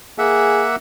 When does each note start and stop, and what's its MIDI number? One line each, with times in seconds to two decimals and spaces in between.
0.18 0.76 58
0.18 0.66 68
0.18 0.76 76
0.18 0.76 78